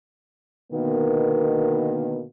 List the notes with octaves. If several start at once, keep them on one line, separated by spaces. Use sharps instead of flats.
B2 D3 D#3 A#3 B3